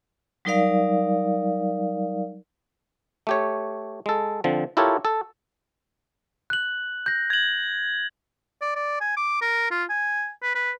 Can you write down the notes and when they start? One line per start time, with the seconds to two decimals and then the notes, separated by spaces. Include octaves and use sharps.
0.45 F#3 G3 D#4 A#4 D5 F5
3.27 A3 G4 C#5
4.06 G#3 A4
4.44 D3 F3 C4
4.77 E4 F4 G4 A4 A#4 C#5
5.05 A4
6.50 F#6 F#7
7.06 G6 A#6
7.30 G#6 F#7
8.61 D5
8.75 D5
9.00 G#5
9.16 D6
9.41 A#4
9.71 F4
9.89 G#5
10.42 B4
10.55 B4